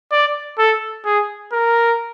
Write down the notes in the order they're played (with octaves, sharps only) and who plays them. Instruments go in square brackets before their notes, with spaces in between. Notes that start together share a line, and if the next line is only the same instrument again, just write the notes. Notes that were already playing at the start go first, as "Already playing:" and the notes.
[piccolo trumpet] D5
A4
G#4
A#4